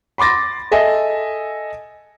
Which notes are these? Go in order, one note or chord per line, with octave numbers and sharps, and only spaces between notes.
B5 C6 D6 A6 A#6
A4 D#5 E5 G#5